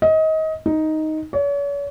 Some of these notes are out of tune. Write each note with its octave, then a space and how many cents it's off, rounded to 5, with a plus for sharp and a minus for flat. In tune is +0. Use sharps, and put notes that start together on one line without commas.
D#5 +25
D#4 +5
C#5 +40